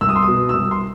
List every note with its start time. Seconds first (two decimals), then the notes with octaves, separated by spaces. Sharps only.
0.01 C2 E6
0.09 D#6
0.16 C6
0.23 D#6
0.27 B2
0.49 E6
0.54 C2 D#6
0.71 C6